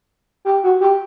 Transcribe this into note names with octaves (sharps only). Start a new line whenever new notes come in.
G4
F#4
G4